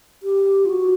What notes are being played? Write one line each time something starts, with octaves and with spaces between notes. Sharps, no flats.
G4
F4
F#4